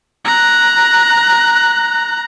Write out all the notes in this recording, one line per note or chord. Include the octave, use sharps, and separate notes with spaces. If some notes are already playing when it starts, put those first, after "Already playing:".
A#5 F#6